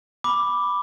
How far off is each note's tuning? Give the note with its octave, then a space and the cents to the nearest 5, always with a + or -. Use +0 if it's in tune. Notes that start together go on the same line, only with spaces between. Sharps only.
B5 +0 D6 +0